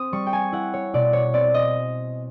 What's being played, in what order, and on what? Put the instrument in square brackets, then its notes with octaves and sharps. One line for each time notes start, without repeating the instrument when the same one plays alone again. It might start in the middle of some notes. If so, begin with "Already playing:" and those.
Already playing: [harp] C4 D#6
G3 C#6
G5
G#5
E4 F#5
C#5
B2 D5
C#5
C4 D5
D#5